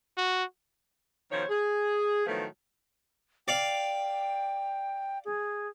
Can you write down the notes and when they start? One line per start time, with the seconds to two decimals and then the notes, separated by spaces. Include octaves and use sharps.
0.18 F#4
1.32 B2 D#3 F3 C5 C#5
1.50 G#4
2.26 A2 D#3 F3 F#3 A3 B3
3.48 D5 F5 G5
5.25 G#4